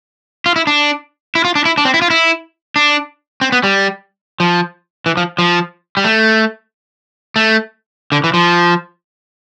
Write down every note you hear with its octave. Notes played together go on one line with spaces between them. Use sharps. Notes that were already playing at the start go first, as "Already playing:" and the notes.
F4
E4
D4
E4
F4
D4
E4
D4
C4
E4
F4
E4
D4
C4
B3
G3
F3
E3
F3
F3
G3
A3
A3
D3
E3
F3